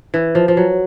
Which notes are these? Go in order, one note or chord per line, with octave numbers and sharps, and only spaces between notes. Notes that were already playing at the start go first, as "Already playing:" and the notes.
E3
F3
F3
F#3